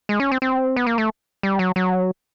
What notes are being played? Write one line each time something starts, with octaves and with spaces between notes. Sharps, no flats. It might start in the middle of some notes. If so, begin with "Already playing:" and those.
G#3
C#4
C4
C4
B3
A#3
A3
G3
F#3
F#3